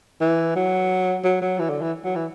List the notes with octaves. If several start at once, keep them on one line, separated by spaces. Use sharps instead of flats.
E3
F#3
F#3
F#3
E3
D3
E3
F#3
E3